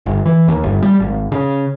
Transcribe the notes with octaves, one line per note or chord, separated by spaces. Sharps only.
G1
E3
D#2
G1
G3
G#1
C#3